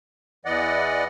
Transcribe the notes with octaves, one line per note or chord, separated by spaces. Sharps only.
E2 E3 D5 D#5 F#5